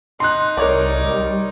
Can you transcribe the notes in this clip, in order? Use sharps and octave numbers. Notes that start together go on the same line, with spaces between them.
D#4 C6 F#6
C2 A#4 C#5 D5
G3